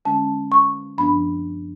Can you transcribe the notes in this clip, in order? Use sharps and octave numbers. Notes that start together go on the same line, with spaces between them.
D3 G#3 C#4 A5
C#6
F#2 F3 B3 D4 B5